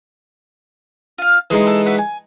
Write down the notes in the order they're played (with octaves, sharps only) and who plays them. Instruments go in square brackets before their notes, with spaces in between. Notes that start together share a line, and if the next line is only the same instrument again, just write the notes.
[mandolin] F4 F5
[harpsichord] E3 G#3 D#4 [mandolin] G#4 C6 F#6
[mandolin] A4
F#4 B4 E5
G#5